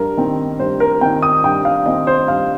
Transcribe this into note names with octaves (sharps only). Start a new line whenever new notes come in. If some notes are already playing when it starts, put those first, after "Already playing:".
Already playing: G2 A#4
D#3 C4
G2 C5
A#4
D#3 C4 G5
D#6
G2 G5
F5
D#3 C4 D#5
C5
G2 F5